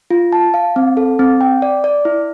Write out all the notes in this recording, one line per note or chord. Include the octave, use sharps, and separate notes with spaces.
F4
A5
F5
C4
A4
C4
G5
D5
D5
E4